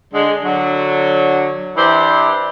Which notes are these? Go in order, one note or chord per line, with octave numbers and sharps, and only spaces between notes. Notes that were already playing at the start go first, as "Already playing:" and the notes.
D3 G#3
D3 F#3
E3 D4 E4 G4 C5